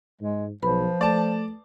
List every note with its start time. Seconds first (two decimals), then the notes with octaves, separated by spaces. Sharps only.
0.21 G#2 G#3
0.62 B1 F3 B4 B5
1.01 A3 D5 A5